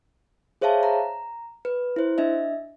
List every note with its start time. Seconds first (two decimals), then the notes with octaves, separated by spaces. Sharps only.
0.61 G#4 C5 C#5 E5 F5 A5
0.83 A#5
1.65 B4
1.96 E4 C5
2.18 D4 D#5 E5